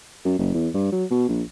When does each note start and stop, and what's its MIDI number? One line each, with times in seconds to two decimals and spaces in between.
0.25 0.38 42
0.38 0.53 30
0.54 0.69 40
0.74 0.92 43
0.92 1.04 54
1.11 1.26 47
1.29 1.42 34